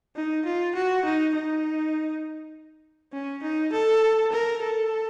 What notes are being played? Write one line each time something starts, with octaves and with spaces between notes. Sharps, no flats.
D#4
F4
F#4
D#4
D#4
C#4
D#4
A4
A#4
A4